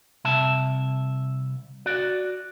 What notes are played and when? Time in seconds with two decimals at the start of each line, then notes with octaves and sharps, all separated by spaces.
0.25 C2 C3 E5 A5
1.86 F#4 D5